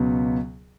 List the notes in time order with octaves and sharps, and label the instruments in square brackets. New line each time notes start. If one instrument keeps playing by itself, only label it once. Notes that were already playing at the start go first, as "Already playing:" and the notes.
Already playing: [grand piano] C#2 B2 F#3 B3